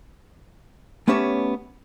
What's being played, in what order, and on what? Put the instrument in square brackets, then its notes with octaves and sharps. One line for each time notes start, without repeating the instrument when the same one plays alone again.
[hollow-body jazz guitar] A3 B3 C#4 G4 C#5 A5